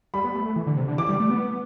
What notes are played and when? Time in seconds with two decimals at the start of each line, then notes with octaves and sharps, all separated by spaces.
0.14 G3 B5
0.24 B3
0.35 A3
0.46 A3
0.56 E3
0.67 D3
0.77 C3
0.88 D3
0.98 E3 D6
1.09 G3
1.20 A3
1.30 B3